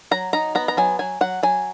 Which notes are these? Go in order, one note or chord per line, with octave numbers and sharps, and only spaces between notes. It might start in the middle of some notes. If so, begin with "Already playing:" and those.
F#3 A#5
D#4 A#5
B3 A#5
A#5
F#3 G#5
F#3 G#5
F#3 F#5
F#3 G#5